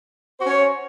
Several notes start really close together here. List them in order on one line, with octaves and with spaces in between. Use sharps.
C5 F#4 C#4 C#5